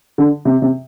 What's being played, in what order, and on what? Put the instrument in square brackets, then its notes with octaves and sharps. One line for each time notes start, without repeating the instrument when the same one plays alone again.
[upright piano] D3
C3
C3